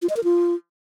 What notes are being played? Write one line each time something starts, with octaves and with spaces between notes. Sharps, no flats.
F4
D#5
A#4
F4